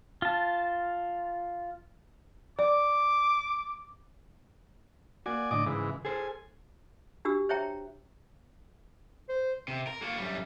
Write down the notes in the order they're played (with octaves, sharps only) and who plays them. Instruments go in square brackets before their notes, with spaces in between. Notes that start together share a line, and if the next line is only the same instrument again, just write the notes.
[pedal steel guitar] F4 A5
[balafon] D5 [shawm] D6
[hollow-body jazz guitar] A#3 F#4 [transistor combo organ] D5 G#5
[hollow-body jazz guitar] A2 D3 [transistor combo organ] D5 D#5 D6
[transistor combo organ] G#2 E3 [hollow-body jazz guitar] C#3
[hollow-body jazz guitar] G#4 A4 C5 [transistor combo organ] G#5
[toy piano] D4 F#4 G4 E6
C5 C#5 E5 G5 A#5
[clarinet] C5
[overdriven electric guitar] C3
A#4
A#3 F#4
F#2 G3